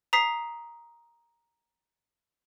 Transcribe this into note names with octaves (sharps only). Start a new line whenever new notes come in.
A#5 D#6 B6 C7